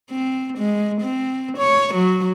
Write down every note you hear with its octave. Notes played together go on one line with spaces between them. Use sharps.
C4
G#3
C4
C#5
F#3